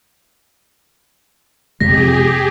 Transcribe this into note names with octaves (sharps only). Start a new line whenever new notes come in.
F2 C3 G#3 G4 G#4 A#6 B6